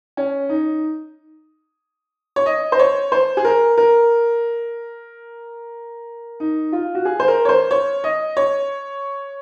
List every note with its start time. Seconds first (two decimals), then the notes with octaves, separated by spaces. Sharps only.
0.17 C#4
0.49 D#4
2.36 C#5
2.46 D#5
2.72 C5
2.79 C#5
3.12 C5
3.37 G#4
3.45 A#4
3.78 A#4
6.40 D#4
6.72 F4
6.95 F#4
7.05 G#4
7.20 C5
7.28 A#4
7.45 C#5
7.49 C5
7.71 C#5
8.04 D#5
8.37 C#5